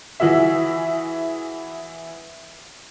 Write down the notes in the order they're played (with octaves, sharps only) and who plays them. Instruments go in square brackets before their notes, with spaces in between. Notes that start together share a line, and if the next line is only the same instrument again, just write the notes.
[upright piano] E3 E4 F#4 G#4 E5